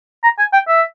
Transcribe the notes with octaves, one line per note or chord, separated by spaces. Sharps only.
A#5
G#5
G5
E5